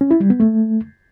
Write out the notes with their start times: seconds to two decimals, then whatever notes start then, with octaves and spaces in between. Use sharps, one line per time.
0.01 C#4
0.11 E4
0.20 G3
0.30 B3
0.40 A3